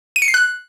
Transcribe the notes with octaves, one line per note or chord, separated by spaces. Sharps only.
D#7
C#7
C7
F#6